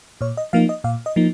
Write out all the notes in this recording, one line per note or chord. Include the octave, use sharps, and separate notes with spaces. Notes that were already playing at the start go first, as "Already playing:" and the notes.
A#2 C#5
D#5
F3 A#3 D#4 F5
D#5
A#2 F5
D#5
F3 A#3 D#4